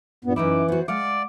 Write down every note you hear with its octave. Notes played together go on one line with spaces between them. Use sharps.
G2 A#2 B3
F#2 E3 D#4 E4 D6
B3 F#4 C5
G#3 D5 F5 F#5 D6